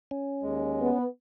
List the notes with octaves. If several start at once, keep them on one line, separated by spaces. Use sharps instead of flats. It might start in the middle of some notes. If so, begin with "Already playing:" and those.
C#4
D#2 G#3
B3